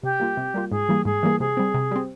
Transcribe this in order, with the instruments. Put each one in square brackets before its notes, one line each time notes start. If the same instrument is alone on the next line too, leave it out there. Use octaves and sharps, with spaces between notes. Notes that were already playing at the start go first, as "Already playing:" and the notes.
[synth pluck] C3 [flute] G4
[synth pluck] G3 A#3 F4
C3
G3 A#3 F4
[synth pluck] G#2 [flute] G#4
[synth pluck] E3 G3 A#3
[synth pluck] G#2 [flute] G#4
[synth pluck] E3 G3 A#3
[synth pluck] C3 [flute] G#4
[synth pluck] G3 C4
C3
G3 C4